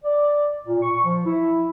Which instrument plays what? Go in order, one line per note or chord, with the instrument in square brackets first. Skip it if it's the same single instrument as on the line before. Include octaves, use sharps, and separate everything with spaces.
[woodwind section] D5
A#2
C#6
F3
E4